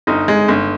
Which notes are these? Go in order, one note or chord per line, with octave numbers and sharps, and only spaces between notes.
G1 D#4
G#3
G1